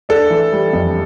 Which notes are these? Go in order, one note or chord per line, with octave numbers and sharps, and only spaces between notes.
D4 A4
E3
G3
F2